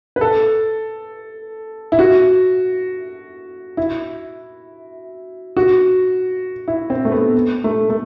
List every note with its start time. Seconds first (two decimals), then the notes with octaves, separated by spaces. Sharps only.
0.16 B4
0.21 A4
1.92 E4
1.99 F#4
3.77 E4
5.57 F#4
6.68 E4
6.90 C4
7.05 A3
7.12 B3
7.64 A3
7.90 A3